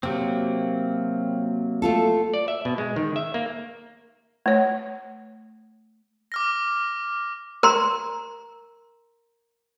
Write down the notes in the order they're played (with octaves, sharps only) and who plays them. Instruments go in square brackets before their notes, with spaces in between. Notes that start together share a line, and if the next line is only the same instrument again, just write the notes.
[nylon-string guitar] C3 [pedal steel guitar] F#3 A#3 C4
[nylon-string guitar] A3 F4 A4
[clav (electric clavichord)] D5
E5
B2
G#3
D#3
E5
A#3
[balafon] A3 C#5
[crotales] D6 F6 A#6
[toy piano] A#4 A#5 C6